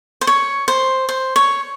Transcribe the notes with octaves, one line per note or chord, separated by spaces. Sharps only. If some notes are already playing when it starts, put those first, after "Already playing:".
C5
C#5
C5
C5
C#5